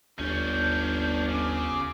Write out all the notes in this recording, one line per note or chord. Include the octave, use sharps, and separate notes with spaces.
G1 D#2 C#4 D4 G6
C#3 D6